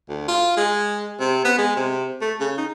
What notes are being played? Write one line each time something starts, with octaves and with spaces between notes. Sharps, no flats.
D2
F4
G#3
C3
B3
G#3
C3
A3
C#3
D#4